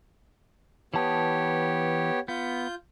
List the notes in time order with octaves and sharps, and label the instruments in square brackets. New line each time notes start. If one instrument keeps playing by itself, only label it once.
[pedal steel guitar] E3 A5 D#6 [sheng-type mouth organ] B3 G4 C#5
[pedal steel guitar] B3 [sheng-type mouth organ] F4 G6